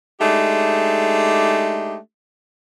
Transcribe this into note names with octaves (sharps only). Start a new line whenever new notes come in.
G#3 A3 D4 D#4 G4